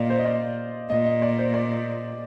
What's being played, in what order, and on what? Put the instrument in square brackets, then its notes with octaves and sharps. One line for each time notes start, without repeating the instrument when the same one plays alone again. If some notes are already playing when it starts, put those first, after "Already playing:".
Already playing: [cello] A#2 [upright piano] D5 D#5 F5
[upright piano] C5
D#5
D5
[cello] A#2 [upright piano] D#5
[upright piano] D#5
D5
C5
D5